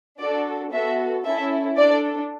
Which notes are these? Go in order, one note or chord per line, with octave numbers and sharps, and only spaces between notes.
D4 F#4 A4 D5
B3 F#4 A4 E5
C#4 E4 A4 E5
D4 A4 D5